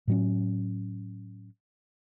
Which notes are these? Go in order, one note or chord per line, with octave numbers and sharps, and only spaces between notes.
A2 F#3 C#4